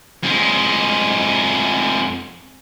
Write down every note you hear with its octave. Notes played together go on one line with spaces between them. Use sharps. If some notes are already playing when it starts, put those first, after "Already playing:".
F2 G#3